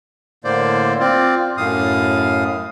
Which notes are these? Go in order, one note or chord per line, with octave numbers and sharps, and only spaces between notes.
A2 D3 A#3 C5 D5
C4 F4 D5
F#2 A2 F5 D#6